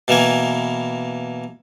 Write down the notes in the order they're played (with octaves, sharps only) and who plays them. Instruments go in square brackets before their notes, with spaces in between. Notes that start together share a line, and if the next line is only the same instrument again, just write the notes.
[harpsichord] B2 E3 A#3 G#5